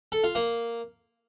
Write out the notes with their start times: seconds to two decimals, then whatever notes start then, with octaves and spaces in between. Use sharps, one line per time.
0.12 A4
0.24 F4
0.35 A#3